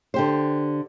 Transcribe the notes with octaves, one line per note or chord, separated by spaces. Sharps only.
D3 G4 C5